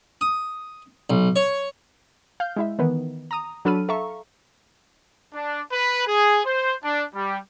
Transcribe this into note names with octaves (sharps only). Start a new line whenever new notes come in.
D#6
B1
C#5
F5 F6 G6
G#3 E4 E5
D#3 E3 B3 B4
A#5 D#6
F#3 D4 A4 B5 F6 D#7
A4 E5 F5 A#5 C#6
D4
B4
G#4
C5
D4
G3